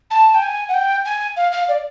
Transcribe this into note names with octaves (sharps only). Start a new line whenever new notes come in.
A5
G5
G#5
F#5
G5
G#5
F5
F5
D5